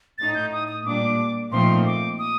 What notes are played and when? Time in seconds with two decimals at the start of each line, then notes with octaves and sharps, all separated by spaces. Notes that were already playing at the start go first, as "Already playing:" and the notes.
0.18 A2 A3 D#4 A6
0.35 G6
0.52 D#6
0.68 D#6
0.86 A#2 G3 D4 D6
1.52 A#2 F3 A3 C4 D#4 C6
1.86 D6
2.19 D#6